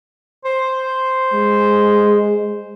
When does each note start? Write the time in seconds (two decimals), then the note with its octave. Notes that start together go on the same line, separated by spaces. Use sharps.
0.45 C5
1.33 G#3